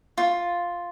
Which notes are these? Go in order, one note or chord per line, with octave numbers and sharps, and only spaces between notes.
F4